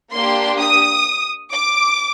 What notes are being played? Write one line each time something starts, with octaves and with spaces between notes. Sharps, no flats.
A#3 D4 G4 C6
D#6
D6